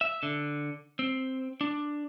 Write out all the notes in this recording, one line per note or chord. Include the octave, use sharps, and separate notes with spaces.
E5
D3
C4
D4